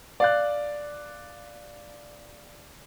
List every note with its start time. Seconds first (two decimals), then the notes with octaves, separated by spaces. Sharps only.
0.20 D5 F5 F#6